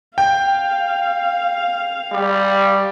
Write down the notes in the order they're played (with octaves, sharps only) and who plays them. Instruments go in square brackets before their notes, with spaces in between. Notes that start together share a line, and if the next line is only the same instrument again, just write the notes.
[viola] F5 [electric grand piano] G5
[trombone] G3